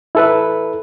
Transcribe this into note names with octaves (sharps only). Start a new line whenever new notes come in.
E4 A4 B4